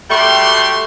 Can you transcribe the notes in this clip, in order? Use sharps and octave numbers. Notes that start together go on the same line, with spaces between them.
G3 A3 F#4 G4 C6